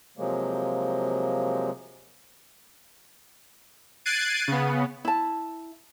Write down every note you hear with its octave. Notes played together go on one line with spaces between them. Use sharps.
C3 F3 F#3 G#3 A#3
F#6 G#6 A6 C7 D7 D#7
C#3 B3
E4 A5